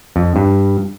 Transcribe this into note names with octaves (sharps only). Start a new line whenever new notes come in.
F2
G2